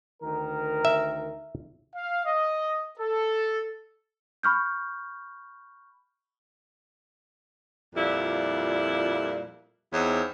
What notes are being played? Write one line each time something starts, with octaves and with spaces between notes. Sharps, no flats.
D2 D#3 A#4
E5
F5
D#5
A4
B5 C#6 F6 G6
F2 A#2 G3 E4
E2 C4 D#4 C#5